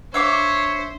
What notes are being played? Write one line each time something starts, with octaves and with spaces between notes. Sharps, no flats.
D4 C5 C#5 E5 F5 D6